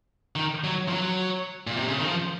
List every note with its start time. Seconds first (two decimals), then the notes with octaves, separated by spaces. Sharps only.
0.36 D#3
0.64 F#3
0.88 F3
0.93 F#3
1.67 A#2
1.77 C3
1.88 C#3
1.98 D#3
2.08 F3